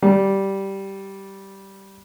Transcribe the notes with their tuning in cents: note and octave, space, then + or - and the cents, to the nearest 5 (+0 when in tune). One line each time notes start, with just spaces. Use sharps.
G3 -10